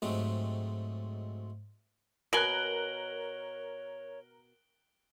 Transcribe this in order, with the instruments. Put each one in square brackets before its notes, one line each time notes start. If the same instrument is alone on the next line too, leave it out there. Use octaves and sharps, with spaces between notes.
[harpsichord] G#2 F#3 G#3 A3 C4 G4
[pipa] B2 G#5 [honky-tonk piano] A#4 F#6 [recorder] C#5 [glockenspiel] D7 F#7 G7